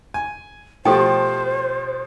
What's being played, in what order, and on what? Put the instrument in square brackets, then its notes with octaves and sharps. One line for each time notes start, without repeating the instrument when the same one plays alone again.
[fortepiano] G#5
[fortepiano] B2 F3 A3 [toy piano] G4 A4 G5 [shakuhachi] C5